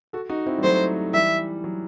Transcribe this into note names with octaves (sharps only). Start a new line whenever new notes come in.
F#4 A4
D#4 F#4
C4 E4
G3
F#3 A3 C5
E3 G3 E5
F#3